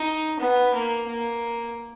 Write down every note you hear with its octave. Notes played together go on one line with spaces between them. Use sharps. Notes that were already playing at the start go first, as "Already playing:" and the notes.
Already playing: D#4
B3
A#3
A#3